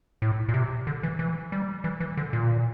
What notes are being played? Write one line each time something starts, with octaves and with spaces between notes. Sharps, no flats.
A2
A#2
C3
D3
E3
E3
G3
E3
E3
D3
A#2